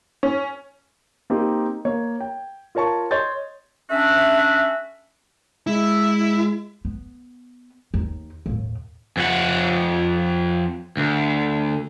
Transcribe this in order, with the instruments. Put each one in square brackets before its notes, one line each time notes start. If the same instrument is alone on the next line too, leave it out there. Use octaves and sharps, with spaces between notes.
[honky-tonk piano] C#4
[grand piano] A#3 C4 D#4 G4
A#3 C#5
G5
F4 A#4 C#5 A5 C#6
C#5 D#5 C6 G6 A6
[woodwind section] A3 C#4 D4 F#4 E5
[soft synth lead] G#3 [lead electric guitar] E4
[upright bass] B3
D#2 D#4
D#2 A2
[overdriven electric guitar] F2 F#5
D2